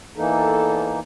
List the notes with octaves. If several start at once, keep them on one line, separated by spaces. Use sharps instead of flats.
E2 E3 A#3 D#4 A4